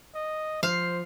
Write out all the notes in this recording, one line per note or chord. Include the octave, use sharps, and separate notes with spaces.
D#5
F3 C5 F5